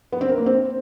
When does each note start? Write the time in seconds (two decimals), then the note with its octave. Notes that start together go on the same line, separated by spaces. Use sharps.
0.12 B3
0.21 C4
0.29 A#4
0.38 A#3
0.46 C4